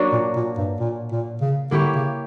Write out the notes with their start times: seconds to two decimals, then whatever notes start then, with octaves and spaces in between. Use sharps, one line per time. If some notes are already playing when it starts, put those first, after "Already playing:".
Already playing: F#3 A#3 D4 F#4
0.12 A#2
0.35 A#2
0.57 G2
0.80 A#2
1.11 A#2
1.41 C#3
1.71 D3 A#3 E4 G4 C#5
1.95 C#3